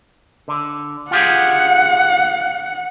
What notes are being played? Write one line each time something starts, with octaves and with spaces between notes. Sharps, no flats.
D3
F4 G4 G#4 F#5